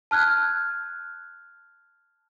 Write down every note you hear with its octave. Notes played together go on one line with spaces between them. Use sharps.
A5 F6 F#6 G#6